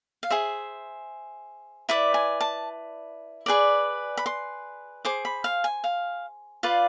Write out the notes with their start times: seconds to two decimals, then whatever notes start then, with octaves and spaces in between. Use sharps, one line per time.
0.23 F5
0.30 G#4 C5 E5
1.89 E4 B4 D5
2.14 G#5
2.41 A5
3.46 G#4 B4 D5
4.17 B5
4.26 C6
5.05 G#4 C5 D6
5.25 B5
5.44 F5
5.64 G#5
5.84 F5
6.63 F4 B4 D5 F5